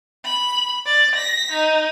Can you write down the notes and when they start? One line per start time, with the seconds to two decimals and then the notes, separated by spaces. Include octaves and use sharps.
0.25 B5
0.86 D5
1.15 A#6 B6
1.52 D#4